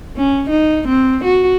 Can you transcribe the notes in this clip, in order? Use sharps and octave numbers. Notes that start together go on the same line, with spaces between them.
C#4
D#4
C4
F#4